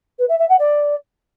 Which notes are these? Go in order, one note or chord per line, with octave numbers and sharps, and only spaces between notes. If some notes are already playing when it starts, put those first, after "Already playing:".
B4
E5
E5
F#5
D5